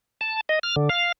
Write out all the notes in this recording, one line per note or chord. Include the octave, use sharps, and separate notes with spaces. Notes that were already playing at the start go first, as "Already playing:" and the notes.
A5
D#5
F6
D3
F5